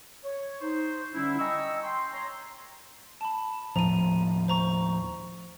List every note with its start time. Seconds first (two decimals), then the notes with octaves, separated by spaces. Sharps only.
0.24 C#5
0.61 D#4 C5
1.13 D3 G3 C#4 E4
1.38 D#5 G5 G#5 A#5 C#6 E6
1.83 G5 C6
2.13 C#5 A#5 C6
3.21 A5 B5
3.76 D#2 A2 F3 A#5 D#7
4.48 C5 A#5 C#6